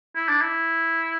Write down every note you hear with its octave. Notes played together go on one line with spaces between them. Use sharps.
E4
D4
E4